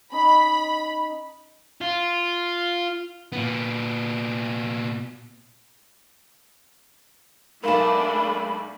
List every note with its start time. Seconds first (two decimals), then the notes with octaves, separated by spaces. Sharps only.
0.12 C#4 D#4 B5
1.81 F4
3.32 A#2 B3
7.64 B1 G#2 A3 D4 A#4 F5 B5 E7